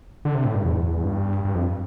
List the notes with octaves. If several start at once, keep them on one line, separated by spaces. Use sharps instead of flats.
D3
C3
A2
G2
E2
G2
G2
F2